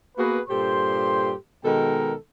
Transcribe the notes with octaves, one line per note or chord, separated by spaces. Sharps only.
A#3 B3 F#4 G#4 B4
G2 A#2 G4 A4 C5 C6
B2 D#3 G#3 A4 A#4 G5